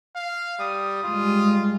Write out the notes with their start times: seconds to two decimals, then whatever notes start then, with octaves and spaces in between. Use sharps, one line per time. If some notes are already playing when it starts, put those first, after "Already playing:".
0.16 F5
0.59 G3 D#6
1.04 G3 G#3 F4